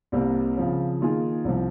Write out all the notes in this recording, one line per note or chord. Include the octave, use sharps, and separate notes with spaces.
C2 C3 G3 A#3
C#3 F3 C4
D#3 A#3 F4 G#4
C2 C3 F3